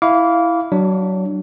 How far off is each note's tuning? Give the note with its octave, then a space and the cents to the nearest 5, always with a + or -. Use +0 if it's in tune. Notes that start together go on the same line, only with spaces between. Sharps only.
E4 +0 F5 +0 D6 -30
F#3 +25 D4 +15